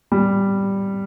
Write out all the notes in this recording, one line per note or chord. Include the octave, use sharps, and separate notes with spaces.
G3